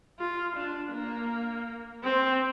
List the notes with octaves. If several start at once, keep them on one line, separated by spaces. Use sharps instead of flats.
F4
D4
A#3
C4